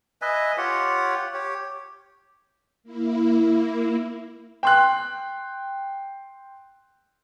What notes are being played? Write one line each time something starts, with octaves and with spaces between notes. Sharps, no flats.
B4 D#5 E5 G#5
F4 G4 C#5 F#5
G4 C#5
A#3 E4
G5 C6 F#6